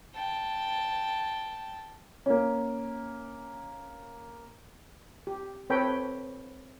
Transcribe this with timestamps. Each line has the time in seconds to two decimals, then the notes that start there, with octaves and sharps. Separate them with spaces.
0.15 G5 A5
2.26 A#3 C#4
5.27 G4
5.70 C4 A4 B4 C#5 G5 B5